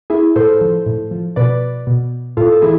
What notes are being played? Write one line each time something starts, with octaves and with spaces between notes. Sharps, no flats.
E4 G#4
A2 A4 C5
F3
A2
F3
B2 B4 D5
B2
A2 F4 A4
A4
E3 E4 G#4